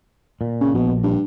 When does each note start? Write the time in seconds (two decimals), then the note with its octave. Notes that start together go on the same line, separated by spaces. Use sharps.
0.41 A#2
0.61 C#3
0.74 A#1 B2
1.03 G2